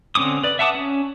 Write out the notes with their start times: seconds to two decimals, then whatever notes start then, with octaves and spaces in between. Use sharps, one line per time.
0.15 D3 C4 C#4 D6 D#6
0.43 B4 D5
0.59 E5 F#5 A5 D6 D#6
0.75 C#4